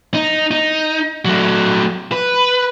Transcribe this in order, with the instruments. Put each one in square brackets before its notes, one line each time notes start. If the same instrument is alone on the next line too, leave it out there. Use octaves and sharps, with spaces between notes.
[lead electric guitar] D#4
D#4
F#3 A3
B4